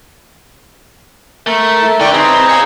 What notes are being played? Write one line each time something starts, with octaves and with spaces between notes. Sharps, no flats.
A3 A#4 E5
E4 A4
D3 E4 D5 G5 C#6
C4 D#4 G#4 B4 A#5
C#5 F5 G#5 E6